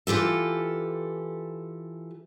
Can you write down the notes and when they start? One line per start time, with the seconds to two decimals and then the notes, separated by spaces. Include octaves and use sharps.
0.07 E3 F4 G4 A4